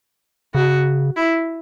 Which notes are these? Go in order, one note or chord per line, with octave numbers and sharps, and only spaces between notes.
C#3 F#4
E4